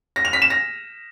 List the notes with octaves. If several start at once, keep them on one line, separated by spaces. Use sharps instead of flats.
A#6
F7
B6
E7
A#6